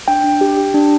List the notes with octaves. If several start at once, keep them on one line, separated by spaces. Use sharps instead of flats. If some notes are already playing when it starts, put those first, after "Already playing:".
D4 G5
D4
G4
G4
D4